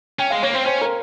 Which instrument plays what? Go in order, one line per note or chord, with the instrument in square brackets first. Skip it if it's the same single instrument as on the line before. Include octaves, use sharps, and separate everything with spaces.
[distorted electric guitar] C#4 [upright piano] G5
[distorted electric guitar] G#3 [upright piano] F5
[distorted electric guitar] A#3 [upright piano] C#5
[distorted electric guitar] C4 [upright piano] C5
[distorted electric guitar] C#4 [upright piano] C5
[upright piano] A#4